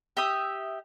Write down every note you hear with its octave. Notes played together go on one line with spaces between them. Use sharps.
G4 E5 D#6